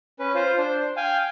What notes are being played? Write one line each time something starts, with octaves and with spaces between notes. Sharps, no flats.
C#4 B4
F4 C5
D4 C5
F5 G5 G#5